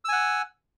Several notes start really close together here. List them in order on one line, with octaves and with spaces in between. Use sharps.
E6 G#5 F#5